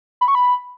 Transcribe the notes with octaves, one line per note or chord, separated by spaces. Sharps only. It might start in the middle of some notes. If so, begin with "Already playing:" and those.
B5
C#6
B5